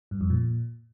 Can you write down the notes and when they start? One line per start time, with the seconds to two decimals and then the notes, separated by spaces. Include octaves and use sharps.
0.11 G2
0.21 F2
0.30 A#2